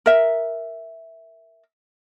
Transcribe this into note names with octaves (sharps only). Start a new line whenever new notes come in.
A#4 E5